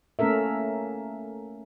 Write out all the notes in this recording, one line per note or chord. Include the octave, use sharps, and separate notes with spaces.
A3 A#3 C#4 A4 A#4 E5